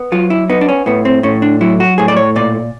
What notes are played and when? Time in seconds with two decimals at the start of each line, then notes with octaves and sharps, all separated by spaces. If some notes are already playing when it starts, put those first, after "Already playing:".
Already playing: B3
0.12 F#3 F4
0.30 E4
0.50 B3 D#4
0.61 D4
0.68 C#4
0.86 A2 B3
1.05 C4
1.23 A2 C#4
1.42 D4
1.61 F#3 E4
1.80 F#4
1.98 A2 G#4
2.08 D5
2.17 C#5
2.36 A#2 D5